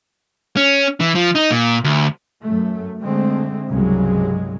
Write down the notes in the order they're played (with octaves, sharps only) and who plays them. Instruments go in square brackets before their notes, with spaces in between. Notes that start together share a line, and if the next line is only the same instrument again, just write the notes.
[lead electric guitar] C#4
E3
F3
D#4
A#2
D2
[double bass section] F#2 A3
D3 G#3 A3 C4
C2 G2 C#3 F#3 G#3